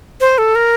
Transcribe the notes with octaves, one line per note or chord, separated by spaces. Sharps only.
C5
A4
A#4